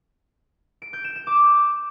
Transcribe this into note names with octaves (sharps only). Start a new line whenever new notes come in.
D7
G6
E7
E7
D6